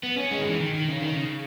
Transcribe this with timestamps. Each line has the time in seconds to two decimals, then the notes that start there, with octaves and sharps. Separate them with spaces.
0.03 B3
0.17 C#4
0.31 G#3
0.39 D#3
0.46 E3
0.60 D#3
0.74 D#3
0.89 C#3
1.02 D#3
1.16 C#3